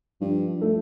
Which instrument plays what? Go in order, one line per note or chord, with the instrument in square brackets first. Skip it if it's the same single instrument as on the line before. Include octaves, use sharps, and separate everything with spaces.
[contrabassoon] G2 [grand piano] F3
[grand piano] A3